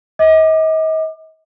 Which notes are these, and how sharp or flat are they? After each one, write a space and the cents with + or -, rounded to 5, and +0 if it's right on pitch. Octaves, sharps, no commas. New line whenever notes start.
D#5 +35 D6 +30